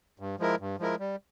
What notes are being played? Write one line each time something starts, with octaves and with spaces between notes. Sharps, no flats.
G2
F3 G#3 E4 A#4
G2
F3 G#3 E4 A#4
G3